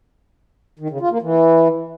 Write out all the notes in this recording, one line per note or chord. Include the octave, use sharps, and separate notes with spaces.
D#3
C#3
F4
A#3
E3